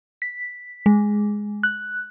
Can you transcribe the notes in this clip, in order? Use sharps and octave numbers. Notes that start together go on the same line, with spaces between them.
B6
G#3
F#6